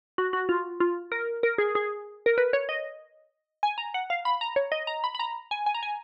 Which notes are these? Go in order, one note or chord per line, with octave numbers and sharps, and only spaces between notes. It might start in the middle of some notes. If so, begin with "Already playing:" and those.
F#4
F#4
F4
F4
A#4
A#4
G#4
G#4
A#4
B4
C#5
D#5
G#5
A#5
F#5
F5
B5
A#5
C#5
D#5
A#5
B5
B5
A#5
G#5
G#5
A#5
G#5